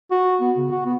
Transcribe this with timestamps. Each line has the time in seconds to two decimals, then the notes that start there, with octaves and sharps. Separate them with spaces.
0.11 F#4
0.41 B3
0.57 C#3
0.71 F#4
0.85 B3